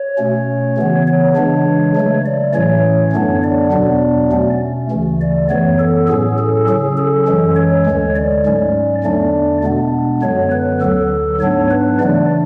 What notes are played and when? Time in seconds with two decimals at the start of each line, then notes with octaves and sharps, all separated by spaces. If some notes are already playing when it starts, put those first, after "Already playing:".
Already playing: C#5
0.18 B2 A3 C#4
0.77 C#3 E3 B3
1.07 C#5
1.36 C#3 E3 G#3 D4
1.96 C#3 F#3 A3
2.26 D5
2.54 A2 E3 A3 C#4 C#5
3.13 F#2 D3 F#3 B3 D4
3.43 D5
3.72 E2 B2 F#3 B3 D4
4.31 B2 A3 C#4
4.90 D2 C#3 E3 A3
5.21 D5
5.49 F#2 E3 B3 C#5
5.79 A4
6.08 A2 F#3 C#4 G#4
6.38 A4
6.68 C#3 F#3 C#4 G#4
6.97 A4
7.27 F#2 E3 G#3 C#4
7.56 C#5
7.87 D2 D3 G#3
8.15 D5
8.45 G#2 F#3 C#4
9.04 E2 D3 A3 D4 D5
9.64 B2 G#3 B3 D4
10.22 F#2 D3 F#3 B3 C#5
10.51 B4
10.81 D2 D3 F#3 A4
11.40 G#2 F#3 B3 D4 C#5
11.70 B4
11.99 C#3 E3 A3 D4 D5